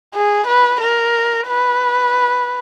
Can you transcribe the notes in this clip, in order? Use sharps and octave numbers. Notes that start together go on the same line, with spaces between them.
G#4
B4
A#4
B4